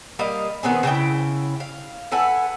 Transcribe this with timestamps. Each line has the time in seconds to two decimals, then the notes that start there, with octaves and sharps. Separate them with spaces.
0.19 G3 A#3 D#5 F5
0.63 D#3 B3 C4 G#4
0.83 C#3 D4 E4 G5
1.60 F5
2.12 A4 B4 F#5 G#5